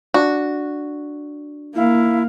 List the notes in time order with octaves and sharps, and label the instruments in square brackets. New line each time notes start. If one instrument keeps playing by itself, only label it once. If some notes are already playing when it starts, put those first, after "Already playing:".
[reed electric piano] D4 [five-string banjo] F#4
[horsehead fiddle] A#3 F5 [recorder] E4